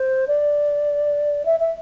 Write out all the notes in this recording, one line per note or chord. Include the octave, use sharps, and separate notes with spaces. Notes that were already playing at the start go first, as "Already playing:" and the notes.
Already playing: C5
D5
E5
E5